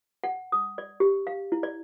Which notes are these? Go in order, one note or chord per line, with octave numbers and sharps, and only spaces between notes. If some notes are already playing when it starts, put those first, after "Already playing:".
F#5
D#6
D5
G4
F5
E4
D5